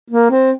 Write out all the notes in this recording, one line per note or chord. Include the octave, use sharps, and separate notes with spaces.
A#3
C4